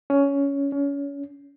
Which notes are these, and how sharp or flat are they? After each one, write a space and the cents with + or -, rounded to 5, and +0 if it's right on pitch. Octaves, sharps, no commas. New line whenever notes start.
C#4 +15
C#4 +30